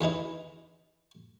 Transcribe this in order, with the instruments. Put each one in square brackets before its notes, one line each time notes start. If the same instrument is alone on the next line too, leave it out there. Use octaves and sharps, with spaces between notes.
[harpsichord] E2 E3 D#4 E4